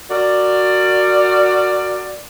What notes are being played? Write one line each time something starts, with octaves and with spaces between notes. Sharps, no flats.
F#4 A#4 D5